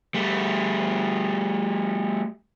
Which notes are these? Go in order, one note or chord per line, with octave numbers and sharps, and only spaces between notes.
G3 A3